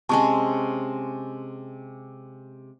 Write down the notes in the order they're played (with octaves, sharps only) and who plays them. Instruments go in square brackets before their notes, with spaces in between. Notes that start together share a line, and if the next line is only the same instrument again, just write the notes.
[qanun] C3 G#3 C#4 [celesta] A5 C#6